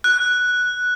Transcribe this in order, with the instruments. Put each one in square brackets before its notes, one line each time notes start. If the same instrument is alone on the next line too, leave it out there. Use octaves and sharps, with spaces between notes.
[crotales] F#6